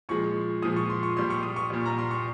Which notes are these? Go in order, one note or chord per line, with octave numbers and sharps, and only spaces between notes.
A#2 F3 G#3 C#6
A#2 F3 G#3 D#6
C#6
C6
C#6
A#2 G3 C6
C#6
D#6
C#6
A#2 G3
A#5
C6
C#6